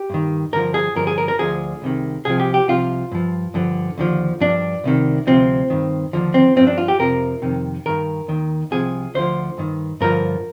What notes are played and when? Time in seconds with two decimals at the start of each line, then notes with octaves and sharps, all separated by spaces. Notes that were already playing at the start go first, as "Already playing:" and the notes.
Already playing: G4
0.10 G2 D#3
0.53 G2 D3 F3 A#4
0.74 G#4
0.95 G2 D3 F3 A#4
1.07 G#4
1.18 A#4
1.28 A#4
1.39 D2 D3 F3 G#4
1.82 C2 C3 D#3
2.25 C2 C3 F3 G#4
2.40 G4
2.54 G4
2.68 C2 C3 F3 F4
3.12 G2 F3
3.54 G2 D3 F3
3.98 D#2 D3 F3
4.40 G2 F3 D4
4.84 C2 C3 D#3
5.27 D2 C3 F3 C4
5.70 G2 D#3
6.13 D#2 D3 F3
6.34 C4
6.56 G2 F3 C4
6.67 D4
6.78 F4
6.88 G4
6.99 F2 C3 F3 A#4
7.42 F2 C3 D#3
7.86 G2 D#3 A#4
8.28 D#2 D#3
8.71 C2 C3 F3 G#4
9.15 D2 D3 F3 C5
9.58 G2 D#3
10.01 G2 D3 F3 A#4